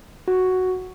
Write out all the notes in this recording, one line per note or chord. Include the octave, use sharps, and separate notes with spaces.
F#4